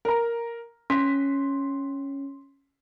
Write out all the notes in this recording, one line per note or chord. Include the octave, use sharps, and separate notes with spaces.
A#4 A#5
C#4 C6 B6